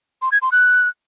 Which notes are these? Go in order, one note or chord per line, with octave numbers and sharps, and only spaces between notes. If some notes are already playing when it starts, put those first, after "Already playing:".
C6
G#6
C6
F#6